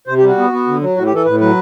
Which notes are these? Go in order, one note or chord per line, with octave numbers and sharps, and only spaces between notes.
C3 C5
G4
G3
F#4
B3
B3
D3
F#3
A2 F#4
G4
E3 A4
A2 B4
F#3 B4